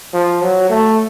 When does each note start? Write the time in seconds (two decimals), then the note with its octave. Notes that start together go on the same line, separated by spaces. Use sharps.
0.14 F3
0.42 F#3
0.70 A3